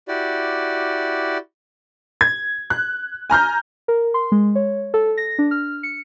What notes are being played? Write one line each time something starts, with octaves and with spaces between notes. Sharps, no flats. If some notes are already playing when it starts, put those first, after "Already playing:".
E4 F#4 G4 D5
G#6
F#6
G#5 A#5 F6 G6
A#4
C6
G#3
C#5
A4
A#6
D4
F6
C#7